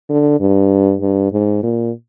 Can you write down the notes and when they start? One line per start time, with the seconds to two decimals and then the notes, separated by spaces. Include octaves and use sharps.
0.09 D3
0.40 G2
1.01 G2
1.32 G#2
1.63 A#2